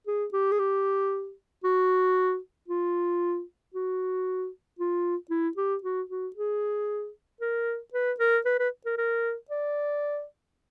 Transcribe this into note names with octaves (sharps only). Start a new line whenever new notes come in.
G#4
G4
G#4
G4
F#4
F4
F#4
F4
E4
G4
F#4
F#4
G#4
A#4
B4
A#4
B4
B4
A#4
A#4
D5